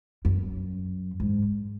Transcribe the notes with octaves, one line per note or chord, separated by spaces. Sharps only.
F#2
G#2